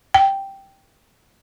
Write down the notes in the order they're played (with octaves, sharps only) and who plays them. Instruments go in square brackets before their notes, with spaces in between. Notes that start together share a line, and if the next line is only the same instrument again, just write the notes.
[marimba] G5